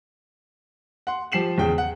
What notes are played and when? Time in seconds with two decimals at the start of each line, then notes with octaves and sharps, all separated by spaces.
1.07 F#5 C6
1.32 F3 G4 C7 E7 F#7
1.58 E2 C#3 G5
1.78 F#5